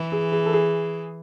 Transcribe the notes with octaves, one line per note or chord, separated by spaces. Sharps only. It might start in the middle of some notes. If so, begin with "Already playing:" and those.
Already playing: E3
G#4
G#4
A4
G#4